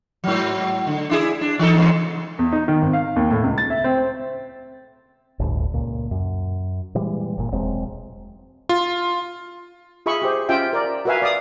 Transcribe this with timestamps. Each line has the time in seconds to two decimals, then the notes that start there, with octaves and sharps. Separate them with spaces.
0.24 G#2 F#3
0.87 D3
1.09 D4 E4 G#4
1.41 D4
1.59 E3 D#4 A4
1.76 E2 G#2 C#3
2.39 E2
2.53 D#4
2.68 D#3
2.82 G#1
2.93 F5
3.16 D#2
3.30 A2
3.44 C#2
3.58 A6
3.70 E5
3.84 C4
3.97 C5
5.39 G1 D2 A2
5.74 C#2 A#2
6.11 F#2
6.95 A#2 E3 G3 G#3
7.37 G1 A#2
7.52 E1 F#3 G#3 C4
8.69 F4
10.06 F4 G#4 E5 B5 C#6
10.22 G4 G#4 C5
10.49 C#4 F4 E5 G5 G#5
10.73 A#4 D5
11.05 F#4 A#4 B4 E5 F5 G#5
11.22 D5 F5 D#6